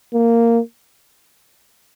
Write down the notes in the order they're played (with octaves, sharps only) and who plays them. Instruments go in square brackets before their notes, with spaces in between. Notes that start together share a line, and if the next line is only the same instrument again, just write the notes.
[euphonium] A#3